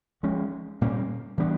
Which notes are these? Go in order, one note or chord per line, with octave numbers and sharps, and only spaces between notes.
F3 G#3 C#4
A#2 G3 A#3 C#4
E3 G3 B3 D4